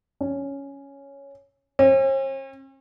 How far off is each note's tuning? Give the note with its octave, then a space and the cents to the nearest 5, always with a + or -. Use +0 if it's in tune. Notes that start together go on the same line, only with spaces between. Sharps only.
C#4 +5
C#4 -45